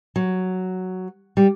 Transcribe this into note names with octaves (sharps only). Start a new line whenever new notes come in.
F#3
G3